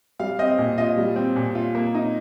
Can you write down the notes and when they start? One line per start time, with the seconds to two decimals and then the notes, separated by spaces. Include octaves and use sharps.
0.20 G3 F5
0.39 C4 D#5
0.58 A#2
0.78 F4 D#5
0.97 G3
1.16 C4
1.36 A#2
1.55 F4
1.75 A#3
1.95 D#4